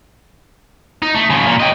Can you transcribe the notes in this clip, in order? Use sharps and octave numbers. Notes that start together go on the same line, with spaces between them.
D#4
A3
C#3 F3
A#2 A#3
G4 D#5